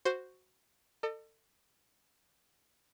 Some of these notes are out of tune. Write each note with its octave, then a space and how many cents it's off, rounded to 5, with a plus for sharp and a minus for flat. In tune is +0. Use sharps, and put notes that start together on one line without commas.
F#4 +0 C5 +0
A4 +30 D#5 -40